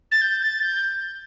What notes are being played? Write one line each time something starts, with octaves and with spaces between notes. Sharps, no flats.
A6
G6
A6
G6